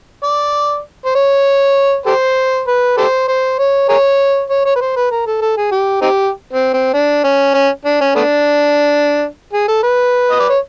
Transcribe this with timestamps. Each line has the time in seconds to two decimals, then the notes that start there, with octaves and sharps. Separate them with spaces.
0.24 D5
1.05 C5
1.15 C#5
2.06 G4 A4 C5
2.67 B4
2.97 G4 A4 C5
3.28 C5
3.59 C#5
3.89 G#4 A#4 C#5
4.50 C#5
4.65 C#5
4.76 B4
4.81 C5
4.96 B4
5.11 A#4
5.26 A4
5.41 A4
5.57 G#4
5.72 G4
6.02 C4 D#4 G4
6.53 C4
6.74 C4
6.94 D4
7.24 C#4
7.54 C#4
7.85 D4
8.01 C#4
8.16 A3 B3 D4
9.53 G#4
9.68 A4
9.83 B4
10.31 D#5
10.40 D5
10.49 C#5